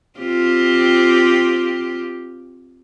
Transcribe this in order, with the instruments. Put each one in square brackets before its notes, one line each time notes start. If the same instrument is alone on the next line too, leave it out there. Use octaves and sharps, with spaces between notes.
[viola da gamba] C4 F4 G4